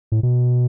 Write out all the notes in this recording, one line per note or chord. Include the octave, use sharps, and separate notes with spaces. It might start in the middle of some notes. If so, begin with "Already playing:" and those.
A2
B2